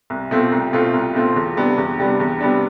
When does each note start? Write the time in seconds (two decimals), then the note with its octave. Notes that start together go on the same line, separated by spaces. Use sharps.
0.10 C2
0.31 B2 A3 C4 F4
0.52 C2
0.73 B2 A3 C4 F4
0.94 C2
1.15 B2 A3 C4 F4
1.36 E2
1.57 C3 G3 B3 D4
1.78 E2
1.99 C3 G3 B3 D4
2.20 E2
2.40 C3 G3 B3 D4